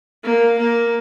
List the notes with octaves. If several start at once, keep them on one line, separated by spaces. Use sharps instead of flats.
A#3
A#3